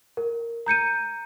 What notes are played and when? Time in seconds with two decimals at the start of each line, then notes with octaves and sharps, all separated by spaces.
0.17 A#4
0.66 A#5 G6 C#7 D#7